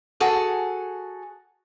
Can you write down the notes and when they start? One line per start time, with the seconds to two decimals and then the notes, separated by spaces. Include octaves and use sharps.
0.20 F#4 G#4 A4